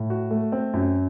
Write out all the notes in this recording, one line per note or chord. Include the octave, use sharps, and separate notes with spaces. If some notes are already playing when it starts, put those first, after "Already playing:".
Already playing: A2
F#4
A3
C4
F#2